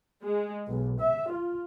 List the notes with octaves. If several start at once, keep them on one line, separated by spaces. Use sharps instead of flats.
G#3
B1
E5
F4